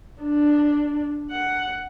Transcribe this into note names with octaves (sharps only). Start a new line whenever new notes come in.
D4
F#5